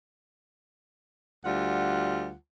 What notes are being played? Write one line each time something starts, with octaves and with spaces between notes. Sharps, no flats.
D2 G3 F4 F#5